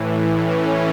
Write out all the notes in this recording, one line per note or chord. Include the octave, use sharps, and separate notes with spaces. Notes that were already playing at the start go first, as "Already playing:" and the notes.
Already playing: A2 E3
A2 E3 C#4